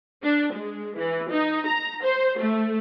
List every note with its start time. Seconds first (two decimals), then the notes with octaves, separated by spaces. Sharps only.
0.23 D4
0.52 G#3
0.96 E3
1.30 D#4
1.66 A#5
2.04 C5
2.39 A3